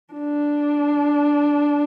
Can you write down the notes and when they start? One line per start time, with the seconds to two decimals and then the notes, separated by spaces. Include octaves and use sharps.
0.13 D4